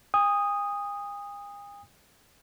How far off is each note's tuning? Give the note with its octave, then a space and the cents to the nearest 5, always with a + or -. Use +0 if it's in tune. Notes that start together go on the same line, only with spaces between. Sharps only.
G#5 -45 D#6 +0